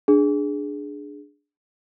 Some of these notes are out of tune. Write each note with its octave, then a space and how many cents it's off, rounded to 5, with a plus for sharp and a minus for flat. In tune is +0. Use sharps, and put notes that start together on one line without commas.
D4 +0 G#4 +0